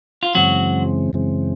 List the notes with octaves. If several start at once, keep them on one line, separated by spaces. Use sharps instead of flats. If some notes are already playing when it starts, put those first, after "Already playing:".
F4
F#2 C#3 E3 F#3 G#3 C4 F#4
F#2 C#3 E3 G#3 C4